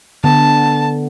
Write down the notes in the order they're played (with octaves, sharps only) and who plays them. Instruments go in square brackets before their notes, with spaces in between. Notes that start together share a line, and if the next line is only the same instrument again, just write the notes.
[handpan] D3 B3 [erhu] A5